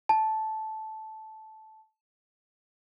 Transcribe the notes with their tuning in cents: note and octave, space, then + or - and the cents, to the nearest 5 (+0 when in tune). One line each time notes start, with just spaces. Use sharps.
A5 -10